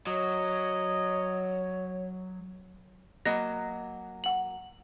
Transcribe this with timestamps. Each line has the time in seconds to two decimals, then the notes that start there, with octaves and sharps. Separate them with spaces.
0.07 F#3 C#5 D#5
3.26 F#3 A#3 D#5 A#6
4.24 F#5 F#7